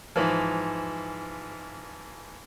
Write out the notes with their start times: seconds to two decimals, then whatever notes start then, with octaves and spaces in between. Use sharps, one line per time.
0.16 G#2 E3 F3